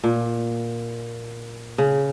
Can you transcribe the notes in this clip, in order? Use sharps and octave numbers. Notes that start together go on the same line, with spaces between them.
A#2
C#3